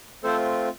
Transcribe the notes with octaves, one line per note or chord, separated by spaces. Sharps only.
A3 C4 F4 A4 C5